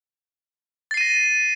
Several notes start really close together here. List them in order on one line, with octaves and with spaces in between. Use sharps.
A6 C7 D#7 A#6